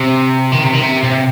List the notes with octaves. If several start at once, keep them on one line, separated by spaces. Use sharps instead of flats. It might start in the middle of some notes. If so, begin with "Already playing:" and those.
Already playing: C3
D#3
C3
D#3
C3
C3